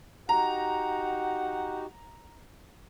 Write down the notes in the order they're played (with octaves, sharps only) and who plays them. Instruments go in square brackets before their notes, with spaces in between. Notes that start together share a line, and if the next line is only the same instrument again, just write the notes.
[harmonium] D#4 F#4 G4 [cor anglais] F#5 [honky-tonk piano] A#5